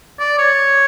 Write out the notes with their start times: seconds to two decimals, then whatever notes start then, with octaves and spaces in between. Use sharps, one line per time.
0.19 D5
0.38 C#5